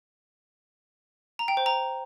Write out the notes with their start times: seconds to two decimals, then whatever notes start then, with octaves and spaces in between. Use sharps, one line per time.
1.39 A#5
1.48 G5
1.57 C5
1.66 A#5